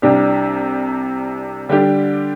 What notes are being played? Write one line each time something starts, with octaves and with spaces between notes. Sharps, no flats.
C2 C3 G3 D4 G4
D3 G3 D4 G4